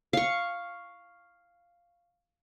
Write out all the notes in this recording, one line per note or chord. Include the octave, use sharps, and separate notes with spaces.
F5 C#6